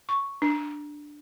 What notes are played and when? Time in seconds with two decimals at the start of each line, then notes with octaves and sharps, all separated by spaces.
0.09 C#6
0.42 D4